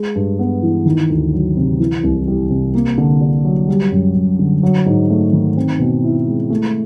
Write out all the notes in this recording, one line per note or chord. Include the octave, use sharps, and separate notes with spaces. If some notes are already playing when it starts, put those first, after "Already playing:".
Already playing: G#3
G2
B3
E3
D#3
D2
F#3
C3
E3
C2
G3
C3
A#3
D3
D4
F#3
G3
F#2
F#2
D3
F#3
G#2
A3
D#3
C4
B2
E4
G#3
A3